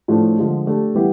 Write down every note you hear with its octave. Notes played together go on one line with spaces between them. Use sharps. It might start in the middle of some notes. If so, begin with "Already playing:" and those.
A2 F3 A3 D4
D3 F3 G#3
A3 D4 G4
E3 G3 B3 E4 G4